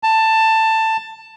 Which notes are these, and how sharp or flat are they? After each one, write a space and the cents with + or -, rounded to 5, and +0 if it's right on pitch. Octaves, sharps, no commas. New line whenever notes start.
A5 +15